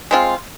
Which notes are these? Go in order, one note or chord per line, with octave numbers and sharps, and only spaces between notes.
G#3 C4 F4